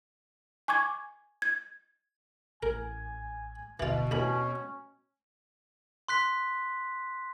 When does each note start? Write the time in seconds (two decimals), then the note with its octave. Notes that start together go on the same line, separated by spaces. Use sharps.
0.68 G#5 C#6 D6 G#6
1.42 G#6
2.63 A1 A#4 G#5
3.80 F#1 D2 B2 E3 F4
4.11 A1 D#2 C#4 D4 B5
6.08 C6 F#6 B6